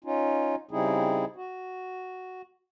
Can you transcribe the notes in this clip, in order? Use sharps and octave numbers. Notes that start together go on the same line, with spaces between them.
C#4 D#4 F4
C#3 G3 C4 D#4 E4 G#4
F#4